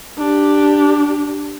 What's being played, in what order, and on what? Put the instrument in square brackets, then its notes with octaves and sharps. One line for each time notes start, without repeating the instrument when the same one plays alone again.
[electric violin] D4 G4